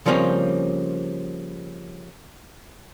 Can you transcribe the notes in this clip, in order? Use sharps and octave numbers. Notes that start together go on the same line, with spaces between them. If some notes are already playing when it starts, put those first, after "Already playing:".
C#3 F3 G3 A#3 C4 C#4